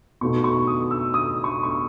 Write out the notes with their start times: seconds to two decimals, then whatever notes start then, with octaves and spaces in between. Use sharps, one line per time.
0.21 B2 A3 D#4 F#4 C#6
0.44 C#6
0.67 D#6
0.91 E6
1.14 D#6
1.44 C#6
1.63 C#6